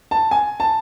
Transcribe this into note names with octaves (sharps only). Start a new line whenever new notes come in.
A5
G#5
A5